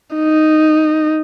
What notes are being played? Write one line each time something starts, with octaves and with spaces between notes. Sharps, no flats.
D#4